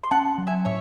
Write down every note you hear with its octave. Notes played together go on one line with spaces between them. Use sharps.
C6
C#4 F#5 A5
F#3
E5 G#5
A2 C#5 E5